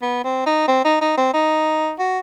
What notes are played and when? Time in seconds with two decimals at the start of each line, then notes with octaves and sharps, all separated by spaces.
0.02 B3
0.24 C4
0.46 D#4
0.67 C4
0.84 D#4
1.01 D#4
1.17 C4
1.33 D#4
1.99 F#4